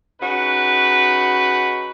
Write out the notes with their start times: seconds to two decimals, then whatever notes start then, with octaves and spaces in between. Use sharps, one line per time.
0.21 C#3 D#4 F#4 B4